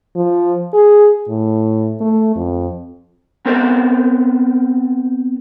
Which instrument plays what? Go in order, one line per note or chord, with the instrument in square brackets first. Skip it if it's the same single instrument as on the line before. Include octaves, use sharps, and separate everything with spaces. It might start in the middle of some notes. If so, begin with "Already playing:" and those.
[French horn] F3
G#4
A2
A3
F2
[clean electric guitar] B3 C4 A#4 C5